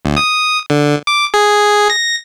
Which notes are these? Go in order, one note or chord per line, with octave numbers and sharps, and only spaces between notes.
D2
D#6
D3
D6
G#4
A#6